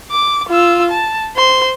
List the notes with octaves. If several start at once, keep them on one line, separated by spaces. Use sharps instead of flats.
D6
F4 E6
A5
C5 C6